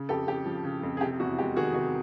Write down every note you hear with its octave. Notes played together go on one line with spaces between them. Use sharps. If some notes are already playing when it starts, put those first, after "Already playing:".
Already playing: C#3
F2 G4 A4
F2 G4
F3
C#3
F2
G#4
C3 G4
E2 F#4
G#3 G4
D#3 F#4 G#4
C3 F#4